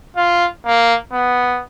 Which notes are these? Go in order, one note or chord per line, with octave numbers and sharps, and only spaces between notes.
F4
A#3
B3